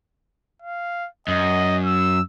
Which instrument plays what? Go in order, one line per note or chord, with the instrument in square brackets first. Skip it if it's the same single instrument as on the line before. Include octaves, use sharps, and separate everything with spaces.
[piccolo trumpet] F5
[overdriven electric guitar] F#2 [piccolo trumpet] D#5
[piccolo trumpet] E6